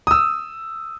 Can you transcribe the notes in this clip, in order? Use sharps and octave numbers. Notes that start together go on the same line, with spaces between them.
D#6 E6